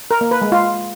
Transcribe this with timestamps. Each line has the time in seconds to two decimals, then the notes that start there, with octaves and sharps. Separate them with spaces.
0.11 A#4
0.21 A#3
0.31 B4
0.42 G#3
0.52 F4